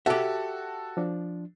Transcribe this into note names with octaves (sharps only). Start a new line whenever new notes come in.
F#4 G4 A4 E5
F3 D4